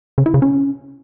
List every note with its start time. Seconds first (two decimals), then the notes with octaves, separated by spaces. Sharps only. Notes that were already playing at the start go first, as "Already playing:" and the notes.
0.18 C#3
0.26 E4
0.34 C#3
0.42 C#4